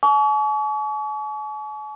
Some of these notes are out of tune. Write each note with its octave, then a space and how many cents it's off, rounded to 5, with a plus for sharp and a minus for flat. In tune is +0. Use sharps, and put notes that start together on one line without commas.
G#5 +45 C#6 +40